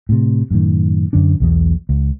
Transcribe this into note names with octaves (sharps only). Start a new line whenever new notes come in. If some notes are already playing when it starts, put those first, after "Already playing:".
A2 C3
F#2 A2 D#3
F#2 D3 C#4 D4
B1 E2 B2
C#2